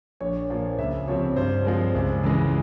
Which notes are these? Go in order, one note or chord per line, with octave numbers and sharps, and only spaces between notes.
A#1 C#5
A#2 F3 A#3
C#2 E5
C3 F3 C4 C#5
G2 C5
F3 G#3 C4
C#2
C#3 E3 G#3